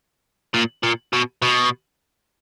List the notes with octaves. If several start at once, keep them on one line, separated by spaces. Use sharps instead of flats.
A#2
A#2
B2
B2